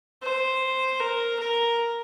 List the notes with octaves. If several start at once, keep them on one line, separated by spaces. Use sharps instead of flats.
C5
A#4
A#4